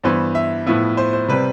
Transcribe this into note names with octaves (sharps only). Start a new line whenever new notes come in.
G2 E3 B3 C5
E5
A2 F3 B3 E4
C5
C5
C3 G3 C4 B4